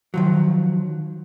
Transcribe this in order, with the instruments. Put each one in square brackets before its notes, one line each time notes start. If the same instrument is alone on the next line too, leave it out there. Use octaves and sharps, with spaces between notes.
[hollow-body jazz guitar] D#3 F3 F#3